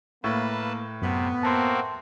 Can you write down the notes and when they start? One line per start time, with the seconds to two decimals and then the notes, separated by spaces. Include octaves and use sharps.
0.24 A2 A#3 B4 A5
1.02 F#2 C3 B3
1.43 A#3 C4 F#4 A5 C6